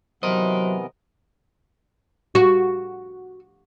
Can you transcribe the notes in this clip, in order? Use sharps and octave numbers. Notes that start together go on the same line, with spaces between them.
C3 E3 F#3 B3 A#4 C5 D#5 C6
F#4